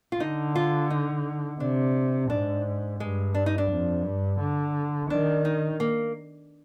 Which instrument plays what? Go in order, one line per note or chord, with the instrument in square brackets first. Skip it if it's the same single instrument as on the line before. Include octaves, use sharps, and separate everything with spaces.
[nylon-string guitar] F4
[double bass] D3 [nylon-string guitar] D#4
[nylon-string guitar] F4
D#4
[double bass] C3 [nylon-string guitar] D4
[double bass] G#2 [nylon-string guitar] D4
[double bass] G2 [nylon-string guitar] G#3
[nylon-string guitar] D4
D#4
D4
[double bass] F2
G2
D3
[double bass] D#3 [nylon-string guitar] D4
[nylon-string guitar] D#4
A#3